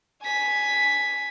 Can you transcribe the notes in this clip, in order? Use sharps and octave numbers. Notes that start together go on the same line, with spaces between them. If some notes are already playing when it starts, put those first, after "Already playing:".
G#5 B6